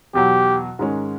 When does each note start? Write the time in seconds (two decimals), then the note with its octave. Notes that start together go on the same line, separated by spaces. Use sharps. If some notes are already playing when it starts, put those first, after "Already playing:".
0.14 E2 B2 F#3 G4
0.79 G#2 D#3 G#3 C#4